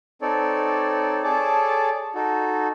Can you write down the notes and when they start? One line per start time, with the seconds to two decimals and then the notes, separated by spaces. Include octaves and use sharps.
0.22 C4 D#4 A4 C#5 D5
1.24 G#4 A4 C#5 D5 A5 D6
2.15 D#4 F#4 A4